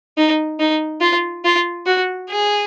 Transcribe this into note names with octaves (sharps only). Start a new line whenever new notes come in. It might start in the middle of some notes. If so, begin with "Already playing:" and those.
D#4
D#4
F4
F4
F#4
G#4